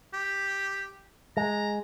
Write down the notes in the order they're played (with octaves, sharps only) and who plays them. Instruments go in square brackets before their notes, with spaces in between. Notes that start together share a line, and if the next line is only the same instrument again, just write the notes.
[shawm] G4
[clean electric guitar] G#3 [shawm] A#5